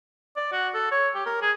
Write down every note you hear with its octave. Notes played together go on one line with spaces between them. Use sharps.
D5
F#4
A4
C#5
G4
A#4
G#4